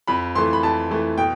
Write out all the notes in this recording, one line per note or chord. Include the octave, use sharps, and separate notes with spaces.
F2 B5
E3 A3 C6
B5
F2 A5
E3 A3
B2 G5